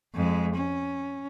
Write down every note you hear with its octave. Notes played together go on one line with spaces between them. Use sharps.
F2 G#3
C#4